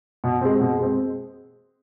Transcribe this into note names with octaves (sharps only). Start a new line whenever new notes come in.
B2
G#3 C4
B2
G#3 C4